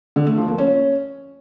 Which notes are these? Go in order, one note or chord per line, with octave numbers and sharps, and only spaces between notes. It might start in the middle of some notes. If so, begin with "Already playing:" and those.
D3
A3
F3
A#3
C#4